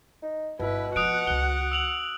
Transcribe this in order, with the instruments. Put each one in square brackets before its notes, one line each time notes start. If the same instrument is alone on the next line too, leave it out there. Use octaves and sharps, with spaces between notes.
[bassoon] D#4
[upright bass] G1 [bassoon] B2 [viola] E4 B4
[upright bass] F3 F4 [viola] F#4 F#5 [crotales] D#6 F#6 D7
[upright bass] C#2 D#3 [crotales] G7
[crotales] E6 F7 F#7